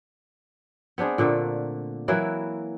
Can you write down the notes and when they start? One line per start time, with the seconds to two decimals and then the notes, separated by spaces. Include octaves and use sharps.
0.98 B3 C4 D4 G#4
1.18 A#2 D3 A3 A#3
2.08 E3 F#3 A#3 E4